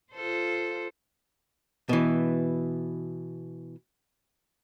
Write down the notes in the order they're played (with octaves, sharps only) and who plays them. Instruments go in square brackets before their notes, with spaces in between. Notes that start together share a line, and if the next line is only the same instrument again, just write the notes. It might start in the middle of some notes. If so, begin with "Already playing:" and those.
[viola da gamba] F4 A4 C5
[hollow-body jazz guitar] B2 E3